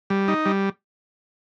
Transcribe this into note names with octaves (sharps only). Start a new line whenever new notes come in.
G3
D#4
G3